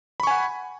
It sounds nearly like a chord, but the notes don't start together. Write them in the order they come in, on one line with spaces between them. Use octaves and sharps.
B5 C#6 G#5 F#5